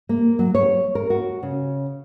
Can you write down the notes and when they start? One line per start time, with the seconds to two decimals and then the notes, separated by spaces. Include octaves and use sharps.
0.09 A#3
0.39 F#3
0.55 C#5
0.95 A#4
1.10 F#4
1.43 C#3